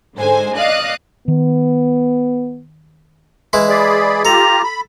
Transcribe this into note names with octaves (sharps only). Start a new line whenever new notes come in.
G#2 D3 G#3 C5 G#5
D5 D#5 F5 D#6 F#6
D#3 B3
E3 G#3 E4
G#4 D5 B5
F4 G4 A4 A#5
B5